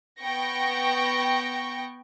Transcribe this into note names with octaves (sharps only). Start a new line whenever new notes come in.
B3 G5 C#6 A#6